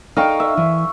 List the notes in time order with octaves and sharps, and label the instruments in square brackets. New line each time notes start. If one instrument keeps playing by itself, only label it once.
[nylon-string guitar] D#4 A4 G5 [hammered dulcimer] F5 C#6
[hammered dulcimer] E5
[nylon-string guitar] E3